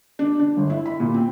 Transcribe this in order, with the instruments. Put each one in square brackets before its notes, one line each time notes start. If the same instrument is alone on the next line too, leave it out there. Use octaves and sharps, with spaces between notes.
[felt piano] D4
D4
G1
E4
B5
A#2
C4